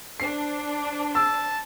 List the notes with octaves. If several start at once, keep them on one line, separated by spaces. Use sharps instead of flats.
D4 C5 C7
A5 E6